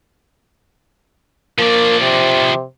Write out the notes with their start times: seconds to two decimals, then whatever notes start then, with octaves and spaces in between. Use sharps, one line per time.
1.58 F3 A#3 D5
2.01 C3